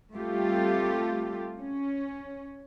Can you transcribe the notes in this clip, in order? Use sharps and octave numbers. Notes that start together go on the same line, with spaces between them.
G3 A3 C4 F4 G4 A4
C#4